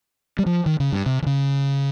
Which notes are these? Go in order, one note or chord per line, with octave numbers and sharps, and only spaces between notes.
G3
F3
D#3
C#3
G2
C3
D#3
C#3